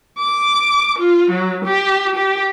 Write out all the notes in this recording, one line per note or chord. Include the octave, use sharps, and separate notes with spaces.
D6
F4
F#3
G4
G4